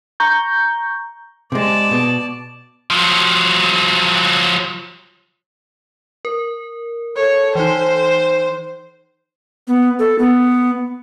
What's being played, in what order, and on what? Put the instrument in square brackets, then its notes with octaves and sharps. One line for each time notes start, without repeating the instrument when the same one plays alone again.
[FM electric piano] A#5 C#6 G6
[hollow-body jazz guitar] C3 G#3 [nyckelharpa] D5 A5
[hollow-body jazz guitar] B2
[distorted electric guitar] F3 F#3
[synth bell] A#4
[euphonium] A4 [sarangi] C#5
[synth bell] E3 D#4 [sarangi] C5
[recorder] B3
A4
B3